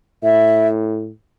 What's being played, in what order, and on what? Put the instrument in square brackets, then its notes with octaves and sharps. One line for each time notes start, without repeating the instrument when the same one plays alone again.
[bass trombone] A2 [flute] E5